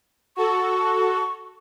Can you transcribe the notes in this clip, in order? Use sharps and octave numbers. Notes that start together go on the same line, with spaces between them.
F#4 A4 C#6